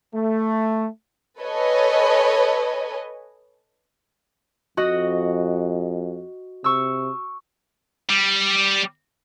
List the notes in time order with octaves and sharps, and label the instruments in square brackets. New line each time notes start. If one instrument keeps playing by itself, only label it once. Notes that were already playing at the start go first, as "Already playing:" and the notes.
[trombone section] A3
[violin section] A4 B4 C#5 D#5 G#5
[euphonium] F2 [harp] F#4 D#5
[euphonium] C3 [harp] C#6 E6
[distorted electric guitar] G3